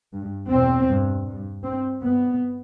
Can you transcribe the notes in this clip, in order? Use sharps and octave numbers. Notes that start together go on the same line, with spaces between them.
G2
E2 B2 C4
G2
G2
G2 C4
G2 B3